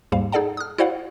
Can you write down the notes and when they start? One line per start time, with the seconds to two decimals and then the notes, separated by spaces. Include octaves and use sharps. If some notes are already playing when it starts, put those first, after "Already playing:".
0.12 D#2 G#2 G3 F5
0.32 D#4 G#4 A4 D5 F#5 A5
0.57 D#6 F6
0.78 E4 F#4 C5 D5 F5 F#5